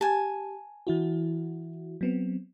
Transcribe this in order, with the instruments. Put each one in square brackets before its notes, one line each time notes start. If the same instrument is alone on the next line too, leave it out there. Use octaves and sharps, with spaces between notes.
[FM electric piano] G4 [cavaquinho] G#5 A5
[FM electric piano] E3 E4 F#4
F#3 B3 C4